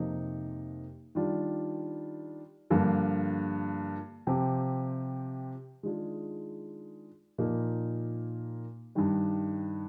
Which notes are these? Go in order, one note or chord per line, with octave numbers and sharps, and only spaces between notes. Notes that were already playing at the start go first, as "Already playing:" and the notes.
Already playing: F2 C3 F3 A#3 D#4
D#3 G3 D4 F4
G2 D3 F3 A#3
C3 F3 C4 G4
D#3 G#3 D4 F4 G#4
A#2 F3 A#3 D#4
G2 D#3 G3